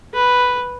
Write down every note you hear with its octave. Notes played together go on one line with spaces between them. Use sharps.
B4